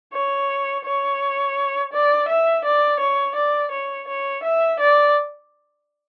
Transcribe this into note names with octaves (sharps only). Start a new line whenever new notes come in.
C#5
C#5
D5
E5
D5
C#5
D5
C#5
C#5
E5
D5